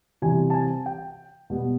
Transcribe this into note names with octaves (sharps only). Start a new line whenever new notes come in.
C3 E3 G3 C4 G#5
A5
G#5
G5
B2 G3 B3